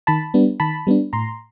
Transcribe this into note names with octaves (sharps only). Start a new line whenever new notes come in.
D#3 A5 B5
G3 B3 D4
D#3 A5 B5
G3 B3 D4
A2 A#5 C6